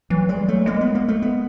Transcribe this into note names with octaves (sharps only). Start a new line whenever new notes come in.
E3 F#3
G3 G#3
F#3 A3
G#3 A#3
B3
A#3
A3
B3